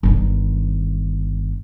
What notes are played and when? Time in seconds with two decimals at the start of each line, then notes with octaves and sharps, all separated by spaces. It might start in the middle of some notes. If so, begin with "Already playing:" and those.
0.03 G1 D#3